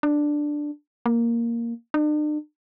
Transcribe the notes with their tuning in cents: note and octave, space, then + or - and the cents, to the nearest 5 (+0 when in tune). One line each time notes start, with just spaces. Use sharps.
D4 +5
A#3 +0
D4 +45